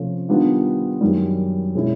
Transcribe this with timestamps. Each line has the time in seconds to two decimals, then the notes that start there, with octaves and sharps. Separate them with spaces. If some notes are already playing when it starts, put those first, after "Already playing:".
Already playing: C3 F3 A3 C#4
0.29 D#3 G3 B3 D4 F4
1.01 F#2 D#3 G3
1.75 B2 G#3 C#4 E4